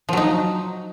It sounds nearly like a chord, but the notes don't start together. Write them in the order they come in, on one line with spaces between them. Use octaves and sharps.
F3 F#3 D#4